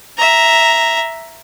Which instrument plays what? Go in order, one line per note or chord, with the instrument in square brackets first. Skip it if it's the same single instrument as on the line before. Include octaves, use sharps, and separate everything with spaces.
[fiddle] E5 A#5